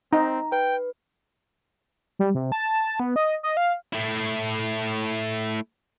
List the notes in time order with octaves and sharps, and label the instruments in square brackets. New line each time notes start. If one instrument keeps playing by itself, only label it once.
[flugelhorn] C4 [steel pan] D#4 [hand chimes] A#5
[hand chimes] B4 [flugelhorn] G5
[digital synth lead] G3
C3
A5
B3
D#5
D#5
F5
[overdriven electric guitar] A3 E4